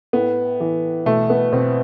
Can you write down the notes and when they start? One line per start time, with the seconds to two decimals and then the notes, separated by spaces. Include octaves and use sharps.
0.13 A2 B3
0.60 E3
1.06 B2 A3
1.30 B3
1.52 B2 C4